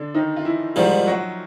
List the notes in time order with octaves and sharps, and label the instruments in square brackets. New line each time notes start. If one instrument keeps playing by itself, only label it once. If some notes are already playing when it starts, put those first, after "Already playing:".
Already playing: [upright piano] D3 D4
D#3 D#4
F4
E3 E4
[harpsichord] G#2 D#3 G3 [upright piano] F3 F4
[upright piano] F#3 F#4